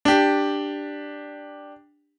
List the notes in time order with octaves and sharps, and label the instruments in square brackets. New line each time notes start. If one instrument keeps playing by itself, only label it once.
[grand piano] D4 G4